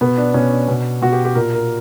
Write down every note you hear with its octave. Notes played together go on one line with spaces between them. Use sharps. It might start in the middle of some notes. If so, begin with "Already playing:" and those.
B2 B3
D4
B2 C#4
D4
B2
B2 F#4
G4
G4
A#2 A#4
A#4